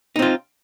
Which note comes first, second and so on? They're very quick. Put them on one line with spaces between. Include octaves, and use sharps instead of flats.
D#4 C4 F4